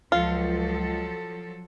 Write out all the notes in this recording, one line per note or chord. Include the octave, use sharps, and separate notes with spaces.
C#2 F3 F#3 F4 A4